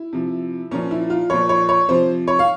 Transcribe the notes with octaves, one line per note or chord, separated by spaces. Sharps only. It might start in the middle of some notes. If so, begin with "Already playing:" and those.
Already playing: E4
C3 F3
A#2 F3 C#4
E4
F4
A#2 F3 C#5
C#5
C#5
C3 F3 C5
C#5
F5